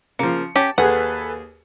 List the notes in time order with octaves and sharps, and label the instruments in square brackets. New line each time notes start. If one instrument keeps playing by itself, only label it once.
[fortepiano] C#3 F3 [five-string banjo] A#3 [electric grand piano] C#7
[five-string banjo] C#4 G4 [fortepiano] A5
[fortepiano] D#2 G#4 [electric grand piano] A4 B4 G#5 [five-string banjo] F#5